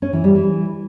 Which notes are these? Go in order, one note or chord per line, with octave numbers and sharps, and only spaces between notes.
C#4
E3
G3
E3